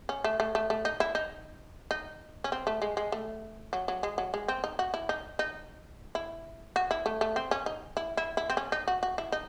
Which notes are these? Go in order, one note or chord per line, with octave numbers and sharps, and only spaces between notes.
C#4
A3
A3
A3
A3
D#4
E4
D#4
D#4
C#4
C4
A3
G#3
G#3
A3
F#3
F#3
G#3
F#3
G#3
C4
D#4
F#4
E4
D#4
D#4
E4
F#4
E4
A3
A3
C4
C#4
D#4
E4
E4
E4
C4
C#4
D#4
F#4
F#4
E4
D#4